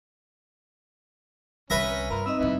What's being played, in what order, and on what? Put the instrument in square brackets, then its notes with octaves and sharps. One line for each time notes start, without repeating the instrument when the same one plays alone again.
[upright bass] C2 D3 [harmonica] C#4 [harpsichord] B4 E5 A#5
[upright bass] G2 [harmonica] F4 A#4 [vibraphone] B5
[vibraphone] C4 D#4 D#5 [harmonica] E6
[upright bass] A2 G3 [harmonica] B3 E4